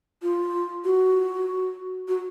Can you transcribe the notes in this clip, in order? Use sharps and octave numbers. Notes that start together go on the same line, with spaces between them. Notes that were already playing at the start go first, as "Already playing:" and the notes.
F4
F#4
F#4